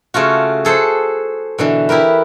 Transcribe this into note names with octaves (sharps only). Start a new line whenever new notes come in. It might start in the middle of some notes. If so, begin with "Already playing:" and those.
C#3 A3 F4 F#4
G#4 A4 C5 F#5
B2 D3 E3
E4 G4 A#4 B4